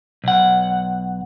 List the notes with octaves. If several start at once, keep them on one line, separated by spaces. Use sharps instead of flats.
B1 F#5